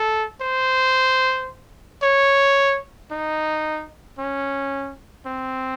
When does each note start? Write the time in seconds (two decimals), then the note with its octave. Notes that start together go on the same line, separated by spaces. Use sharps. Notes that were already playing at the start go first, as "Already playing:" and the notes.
Already playing: A4
0.41 C5
2.03 C#5
3.11 D#4
4.18 C#4
5.26 C4